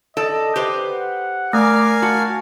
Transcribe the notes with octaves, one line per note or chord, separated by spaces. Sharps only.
A4 D5 D#5
G4 B4 C5
F#5
A3 A#4 F5 G#5 D6
F#4 A5